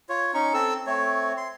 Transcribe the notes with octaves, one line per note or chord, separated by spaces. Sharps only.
F4 C#5
C#4 D#4 C#6
C4 A4 E6
A3 C4 C#5
C6